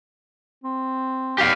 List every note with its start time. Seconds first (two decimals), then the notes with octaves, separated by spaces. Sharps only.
0.64 C4
1.38 B3 G4 F5